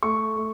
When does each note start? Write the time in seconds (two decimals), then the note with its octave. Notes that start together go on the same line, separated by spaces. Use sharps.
0.03 A3 C#6
0.37 A3